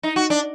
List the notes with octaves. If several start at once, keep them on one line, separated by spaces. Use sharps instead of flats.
D#4
F#4
D4